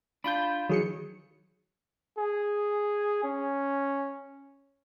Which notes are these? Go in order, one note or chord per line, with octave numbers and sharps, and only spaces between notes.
D4 F4 B5 G6
D#3 E3 F#3 G#4 C#7
G#4
C#4